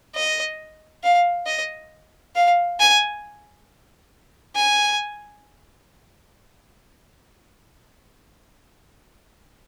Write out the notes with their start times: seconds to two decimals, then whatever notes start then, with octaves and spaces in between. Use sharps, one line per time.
0.15 D#5
1.03 F5
1.47 D#5
2.36 F5
2.80 G#5
4.55 G#5